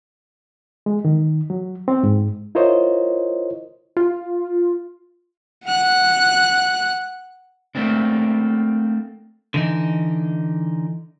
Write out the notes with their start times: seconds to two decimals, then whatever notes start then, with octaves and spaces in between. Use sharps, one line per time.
0.86 G#3
1.05 D#3
1.50 F#3
1.88 C4
2.03 G#2
2.55 E4 F4 A#4 C5 C#5 D#5
3.97 F4
5.65 F#5 F#6
7.75 A3 A#3 C4 D4
9.54 D3 E3 D#4